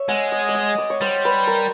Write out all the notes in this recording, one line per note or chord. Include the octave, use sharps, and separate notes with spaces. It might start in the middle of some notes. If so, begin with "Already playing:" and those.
Already playing: C#5 E5
G#3 F#5
D#5
D5
D#5
D5
C#5
G3 C5
B4
A#4